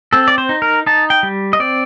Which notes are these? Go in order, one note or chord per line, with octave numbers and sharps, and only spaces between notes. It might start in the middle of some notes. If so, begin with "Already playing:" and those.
C4 A4
D5
C5
D#4
A#4
D#4 A5
G5
G3
D#5
C4 D5